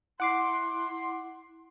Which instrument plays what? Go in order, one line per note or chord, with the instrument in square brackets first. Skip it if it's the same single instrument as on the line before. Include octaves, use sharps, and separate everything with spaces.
[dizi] E4 [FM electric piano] F#5 D6 C7 [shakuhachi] C6